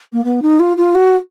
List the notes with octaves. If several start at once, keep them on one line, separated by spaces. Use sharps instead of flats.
A#3
B3
D#4
F4
F4
F#4